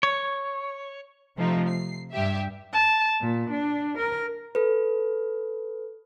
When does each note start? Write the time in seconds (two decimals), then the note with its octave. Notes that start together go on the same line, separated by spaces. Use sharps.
0.03 C#5
1.38 C3 F3 A3 D#4
1.68 C7
2.13 G2 G4 E5
2.72 A5
3.21 A#2
3.51 D4
3.97 A#4
4.55 A4 B4